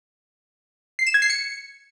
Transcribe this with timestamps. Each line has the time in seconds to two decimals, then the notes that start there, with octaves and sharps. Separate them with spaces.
0.99 C7
1.07 E7
1.14 G#6
1.22 C7
1.30 C#7